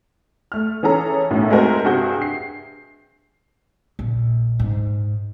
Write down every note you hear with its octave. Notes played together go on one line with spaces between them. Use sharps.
A3 F6
E3 C#4 G#4 A4 A#5
B1 F#2 A2
G#3 A3 C4 F#4 A#4 C5
G2 C3 F#4 G#4 G6
C7
A#1
G#2